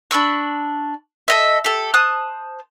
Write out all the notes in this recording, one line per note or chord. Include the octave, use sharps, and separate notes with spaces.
D4 B5 C#6 E6
A4 D#5 E5
G4 A4
C5 A5 D#6 F#6